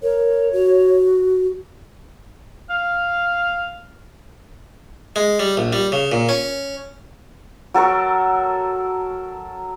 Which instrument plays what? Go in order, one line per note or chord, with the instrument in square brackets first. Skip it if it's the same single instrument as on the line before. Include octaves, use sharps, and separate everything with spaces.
[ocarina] A#4 [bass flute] C#5
[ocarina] F#4
[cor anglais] F5
[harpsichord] G#3
G3
A#1
G3
C#3
A#2
C#4
[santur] F#3 A4 A#4 C#6